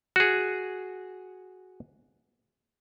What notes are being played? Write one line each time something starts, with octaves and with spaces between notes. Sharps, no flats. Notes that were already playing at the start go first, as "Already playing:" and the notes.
F#4 G#4